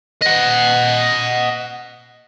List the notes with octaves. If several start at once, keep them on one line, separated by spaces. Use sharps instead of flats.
D#5 F#5